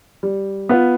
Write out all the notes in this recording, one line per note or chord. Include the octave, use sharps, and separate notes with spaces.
G3
B3 F4 B4